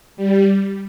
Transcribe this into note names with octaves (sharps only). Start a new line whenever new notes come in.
G3